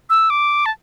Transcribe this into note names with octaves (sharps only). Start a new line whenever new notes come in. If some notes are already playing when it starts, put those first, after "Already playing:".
E6
D6
A5